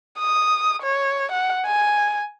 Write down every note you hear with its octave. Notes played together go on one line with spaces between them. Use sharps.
D#6
C#5
F#5
G#5